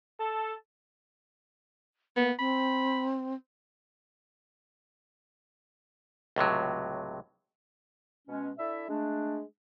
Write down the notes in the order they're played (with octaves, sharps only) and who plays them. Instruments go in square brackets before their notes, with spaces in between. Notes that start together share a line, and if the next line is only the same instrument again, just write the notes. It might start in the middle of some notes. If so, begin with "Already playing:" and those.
[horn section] A4
[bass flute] A#3 [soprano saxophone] B3
[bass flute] C4 [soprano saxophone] B5
[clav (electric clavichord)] C#2 A2 C3 F#3
[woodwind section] B2 G#3 C#4
D4 E4 A4 D5 E5
G#3 A3 D4